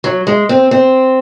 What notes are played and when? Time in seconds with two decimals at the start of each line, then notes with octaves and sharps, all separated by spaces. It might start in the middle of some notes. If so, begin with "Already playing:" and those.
0.04 F#3
0.27 G#3
0.49 C4
0.71 C4